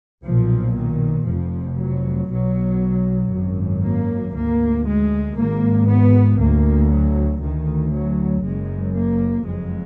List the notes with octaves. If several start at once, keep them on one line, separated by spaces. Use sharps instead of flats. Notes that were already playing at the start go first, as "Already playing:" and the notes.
B1 A#2 F3
D#3
F1 F2 F3
F#3
B1 B2 F#3
G#1 F#2
A#3
D2 A#3
G#3
G#1 G#2 A#3
B3
D2 A#3
F#3
D2 D#3
F#3
F#1 F#2 G#3
A#3
F#1 F2 G#3